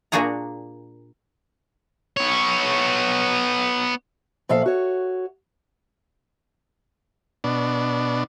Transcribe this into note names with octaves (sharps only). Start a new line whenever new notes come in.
A#2 A#3 D4 F#4 G#4 A#5
B3 C#5
A#2 F3 A4 E5 F5
F#4 C#5
B2 D4